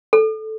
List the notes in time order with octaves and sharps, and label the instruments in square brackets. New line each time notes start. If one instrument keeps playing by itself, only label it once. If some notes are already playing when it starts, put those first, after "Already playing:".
[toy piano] A4